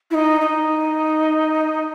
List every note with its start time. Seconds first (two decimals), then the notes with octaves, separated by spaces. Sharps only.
0.10 E4
0.14 D#4
0.41 D#4